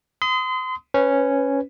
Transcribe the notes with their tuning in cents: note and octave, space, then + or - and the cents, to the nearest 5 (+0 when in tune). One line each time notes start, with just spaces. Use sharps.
C6 -35 D#6 +15
C#4 +0 B4 +15